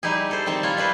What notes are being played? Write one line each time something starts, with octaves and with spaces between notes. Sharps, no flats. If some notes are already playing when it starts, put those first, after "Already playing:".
G3 D#4 E4 G4 G#4
A4 C5
D#3 G3 C4 A5
E4 F4 C#5
G3 E4 B4 C5